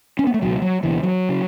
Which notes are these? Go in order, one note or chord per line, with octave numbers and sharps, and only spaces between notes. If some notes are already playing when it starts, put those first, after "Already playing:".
C#4
B3
A3
C#2 B2 F#3
F#3
C#2 B2 E3
F#3
C#3